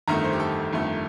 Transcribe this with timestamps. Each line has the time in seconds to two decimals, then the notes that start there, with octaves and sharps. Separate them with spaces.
0.07 G1 F2 D#3 A3 A#5
0.24 C5
0.33 G4
0.40 A4
0.73 G1 F2 D#3 A3